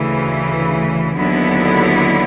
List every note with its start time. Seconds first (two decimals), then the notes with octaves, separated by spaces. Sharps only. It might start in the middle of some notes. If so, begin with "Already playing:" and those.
Already playing: D2 C#3 E3
1.15 D#2 D3 F#3 B3 E4